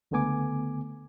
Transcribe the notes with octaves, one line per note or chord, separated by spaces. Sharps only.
C#2 D3 A3 B3 G#5 D6